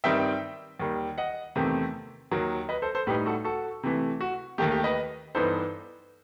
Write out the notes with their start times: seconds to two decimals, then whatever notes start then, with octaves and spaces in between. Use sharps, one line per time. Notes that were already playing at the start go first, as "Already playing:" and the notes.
0.04 G2 D#3 G3 C4 D#4 E5 G5
0.80 D#2 D#3 G3
1.18 D#5 F#5
1.56 E2 C3 D#3 A3 C4
2.31 D#2 D#3 F#3
2.69 B4 D#5
2.82 A4 C5
2.95 A4 C5
3.07 A2 G3 D#4 G4 B4
3.26 F#4 A4
3.45 F#4 A4
3.83 C3 E3 A3
4.21 F#4
4.58 D#2 D#3 A3 G4
4.72 G4
4.84 B4 D#5
5.35 G2 E3 B3 D#4 A4 C5